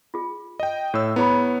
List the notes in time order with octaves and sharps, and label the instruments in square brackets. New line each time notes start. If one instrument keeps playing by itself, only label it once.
[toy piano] F4 G#4
[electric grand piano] D#5 G5
[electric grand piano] A2 E6 [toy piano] C#5
[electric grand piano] B3 C#5 [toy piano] E4 G#4 B5